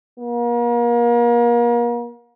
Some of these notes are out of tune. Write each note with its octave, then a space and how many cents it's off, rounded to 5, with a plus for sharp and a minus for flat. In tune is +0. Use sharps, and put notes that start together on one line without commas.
A#3 +35